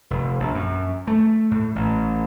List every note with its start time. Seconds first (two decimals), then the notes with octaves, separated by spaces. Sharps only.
0.10 F1
0.40 A#1
0.54 F#2
1.07 A3
1.51 A2
1.76 A1